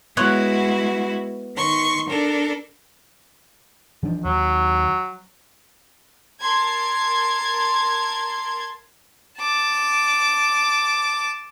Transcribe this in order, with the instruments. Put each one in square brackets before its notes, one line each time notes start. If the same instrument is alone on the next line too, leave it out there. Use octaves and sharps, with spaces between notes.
[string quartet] G#3 E4 F#4 [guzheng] B3 C#5 F#5
[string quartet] D#3 C6 C#6
D4 A4 A#4
[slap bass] E3 F3 D4
[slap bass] D#2 [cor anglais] F#3
[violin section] A#4 A5 C6 G#6
[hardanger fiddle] A5 D6